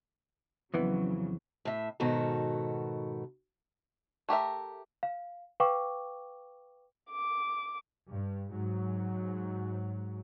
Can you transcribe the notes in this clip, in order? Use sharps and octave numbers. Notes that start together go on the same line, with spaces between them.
F2 C#3 E3 F#3 B3
A2 E5
G#2 B2 D#3 F#4 A4
A3 G4 A#4 E5
F5
B4 F5 G5 C#6 D6
D6
G2
G#2 F#3